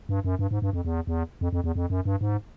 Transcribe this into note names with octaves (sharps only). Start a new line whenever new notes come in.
G2
F#2
G2
G#2
G2
F2
E2
E2
F2
F2
E2
F2
F#2
G2
G#2